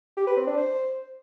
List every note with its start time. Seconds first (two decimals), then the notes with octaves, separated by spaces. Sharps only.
0.17 G4
0.27 B4
0.37 C4
0.47 D4
0.57 C5